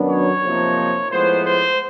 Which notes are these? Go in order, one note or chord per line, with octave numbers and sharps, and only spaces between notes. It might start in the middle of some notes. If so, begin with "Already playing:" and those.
Already playing: F#2 D#3 F#3 B3 D4
C#5
C3 F3 A#3 D#4
A2 F3 G#3 B3 C5
C5